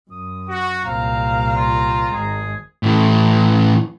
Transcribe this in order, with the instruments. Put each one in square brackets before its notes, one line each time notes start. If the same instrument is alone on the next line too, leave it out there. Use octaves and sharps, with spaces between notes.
[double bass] F#2 [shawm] D#6
[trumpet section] F#4
[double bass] C2 A#2 [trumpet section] C4 A#5 [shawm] F5
[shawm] F4
[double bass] G#1 G#3 [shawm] G#4
[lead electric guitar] A2 E3